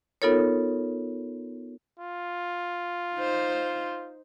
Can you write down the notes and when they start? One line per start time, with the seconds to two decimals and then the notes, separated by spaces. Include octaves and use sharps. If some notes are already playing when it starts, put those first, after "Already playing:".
0.22 B3 D#4 F4 A4 A#4 C#5
2.00 F4
3.15 D#4 C5